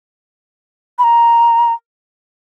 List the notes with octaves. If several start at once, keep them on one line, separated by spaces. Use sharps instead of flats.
B5
A#5